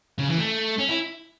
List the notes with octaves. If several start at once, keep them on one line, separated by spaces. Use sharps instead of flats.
C#3
E3
A3
C#4
E4